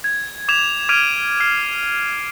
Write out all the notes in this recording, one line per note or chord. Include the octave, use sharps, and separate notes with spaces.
G#6
D6 G#6 E7 F7
D6 F6 G#6 D7 D#7 F7
F6 C7